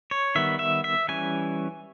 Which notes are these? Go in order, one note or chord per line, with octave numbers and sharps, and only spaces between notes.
C#5
D#3 G3 B3 E5
E5
E5
E3 G3 C#4 G#5